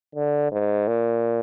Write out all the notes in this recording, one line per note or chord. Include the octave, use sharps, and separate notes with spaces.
D3
G#2
A#2